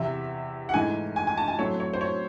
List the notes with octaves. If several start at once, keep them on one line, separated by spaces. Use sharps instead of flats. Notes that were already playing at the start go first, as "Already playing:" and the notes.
Already playing: E2 C3 E3 E5
F#5
G#2 E3 A3 G#5
G#5
G#5
A5
G#5
A2 F#3 A3 C4 C#5
C#5
C5
C#5